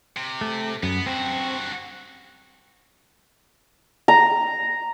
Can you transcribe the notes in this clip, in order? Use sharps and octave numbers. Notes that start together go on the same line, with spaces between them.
C3
A3
F#2 B3
G2 C4 F#4
A#5